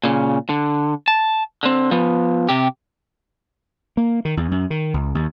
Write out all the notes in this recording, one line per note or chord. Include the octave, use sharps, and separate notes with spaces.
A#2 C#3
D3
A5
D3 C4
F3 B3
C3 G4
A#3
D#3
E2
F#2
D#3
C#2
D#2